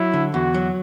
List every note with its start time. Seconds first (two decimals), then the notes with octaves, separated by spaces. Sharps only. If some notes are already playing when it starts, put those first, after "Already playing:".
Already playing: F#3 E4
0.14 D3
0.34 E2 F#4
0.54 F#3